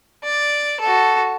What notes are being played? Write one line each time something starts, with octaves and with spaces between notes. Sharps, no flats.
D5
F#4 A4